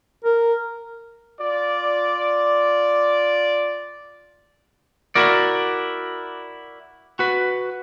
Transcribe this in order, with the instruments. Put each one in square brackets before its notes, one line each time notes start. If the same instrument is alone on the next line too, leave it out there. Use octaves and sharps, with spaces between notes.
[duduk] A#4
[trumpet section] F4 D5
[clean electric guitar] E4 F#4 A#4 D5
F#4 B4